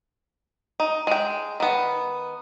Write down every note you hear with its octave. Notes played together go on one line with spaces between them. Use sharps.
D#4
G#3 G5
D#3 B3